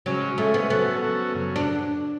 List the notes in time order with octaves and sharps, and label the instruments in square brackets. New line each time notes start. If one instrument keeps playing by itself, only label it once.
[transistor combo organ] C#3 G#3 C#4 [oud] F#3
[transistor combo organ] C#3 G#3 C#4 [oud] A3
[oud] B3
[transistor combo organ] F#3 C#4 F#4 A4 [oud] B3
[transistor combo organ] F#3 C#4 F#4 A4
F#2 C#3 F#3
[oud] D4